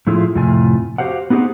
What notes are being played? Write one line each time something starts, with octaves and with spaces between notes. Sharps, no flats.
A2 F3 A3 E4 F4 G#4
F2 A2 C3 F4 G#5
F#4 G4 C5 F5 F#5
B3 D#4 G4 G#4 C5 F#5